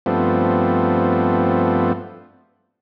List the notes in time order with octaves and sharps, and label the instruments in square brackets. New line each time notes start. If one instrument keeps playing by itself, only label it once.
[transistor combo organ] G2 F3 A3 B3 C4